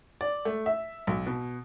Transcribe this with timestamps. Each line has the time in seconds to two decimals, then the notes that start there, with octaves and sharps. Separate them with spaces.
0.21 D5
0.45 A3
0.66 E5
1.07 B1
1.27 B2